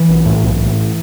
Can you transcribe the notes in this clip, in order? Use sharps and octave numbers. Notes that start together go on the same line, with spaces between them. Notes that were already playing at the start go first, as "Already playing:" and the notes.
Already playing: E3
B1
A2
B1
A2